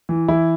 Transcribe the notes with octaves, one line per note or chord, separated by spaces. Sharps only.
E3
E3 E4